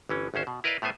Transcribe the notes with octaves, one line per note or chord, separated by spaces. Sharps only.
G1 E3 C#4
G#1 D2 C#4 C5
B2
E4 A#4 B4 D5 D#5 F5
A2 A3 B3 C5 G#5